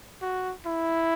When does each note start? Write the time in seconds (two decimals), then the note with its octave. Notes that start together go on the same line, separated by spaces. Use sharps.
0.21 F#4
0.66 E4